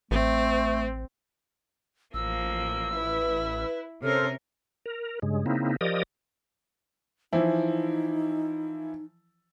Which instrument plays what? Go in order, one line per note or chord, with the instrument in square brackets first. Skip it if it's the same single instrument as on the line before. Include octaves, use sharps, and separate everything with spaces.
[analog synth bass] A1 [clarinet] A3 [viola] C4
[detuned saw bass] A1 [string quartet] F3 A#3 [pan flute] E6
[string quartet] E4 [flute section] B4
[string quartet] C3 C#4 A#4 [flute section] A4 C5 F6 [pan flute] C#5
[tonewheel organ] A#4
G2 C#3 G#3
C#3 A#3 C4 D#4 E4
F3 G4 A#4 D5 D#5 D#6
[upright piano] E3 F3 E4 [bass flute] D#4